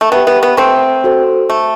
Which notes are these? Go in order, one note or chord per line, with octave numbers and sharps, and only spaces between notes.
A3
B3 G4 B4 E5 G5
B3
B3
A3 C4
F#4 A4 C5
A3